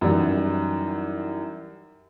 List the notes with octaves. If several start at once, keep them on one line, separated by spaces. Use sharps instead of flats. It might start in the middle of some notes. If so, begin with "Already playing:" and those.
F#2 D#3 E3 G3